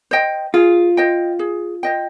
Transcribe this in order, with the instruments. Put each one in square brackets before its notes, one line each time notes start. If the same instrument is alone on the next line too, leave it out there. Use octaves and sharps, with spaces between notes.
[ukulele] C5 D#5 G5
[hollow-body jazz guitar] F4 [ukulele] G#4
[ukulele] C5 D#5 G5
G#4
C5 D#5 G5